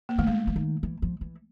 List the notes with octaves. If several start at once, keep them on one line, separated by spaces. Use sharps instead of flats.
A#3
D#3 A3
D3 G#3
E3
D#3
E3
F3
E3